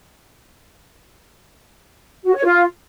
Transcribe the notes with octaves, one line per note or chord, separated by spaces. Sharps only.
F#4
C#5
F4